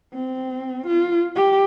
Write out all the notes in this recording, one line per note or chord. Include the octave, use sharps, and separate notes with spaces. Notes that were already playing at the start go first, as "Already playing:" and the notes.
C4
F4
G4